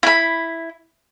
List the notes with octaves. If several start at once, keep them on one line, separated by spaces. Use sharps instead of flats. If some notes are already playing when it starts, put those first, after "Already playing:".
E4 B5